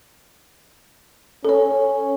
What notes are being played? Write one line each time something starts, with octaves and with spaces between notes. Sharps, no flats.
C#4 A4 C#5